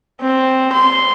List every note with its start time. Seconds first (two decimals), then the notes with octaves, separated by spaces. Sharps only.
0.21 C4
0.72 C6